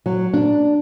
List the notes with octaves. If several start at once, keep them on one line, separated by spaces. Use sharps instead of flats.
F#3
D4